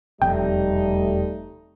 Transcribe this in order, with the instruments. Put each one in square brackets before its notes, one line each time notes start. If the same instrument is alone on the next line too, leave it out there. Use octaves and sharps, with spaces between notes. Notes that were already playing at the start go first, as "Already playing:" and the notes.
[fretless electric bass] E1 F2 C3 [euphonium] G3 [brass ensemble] A3 D#4 [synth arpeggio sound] G5